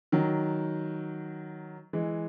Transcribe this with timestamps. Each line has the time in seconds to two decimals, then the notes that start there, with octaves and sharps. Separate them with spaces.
0.12 D#3 F#3
1.93 E3 G#3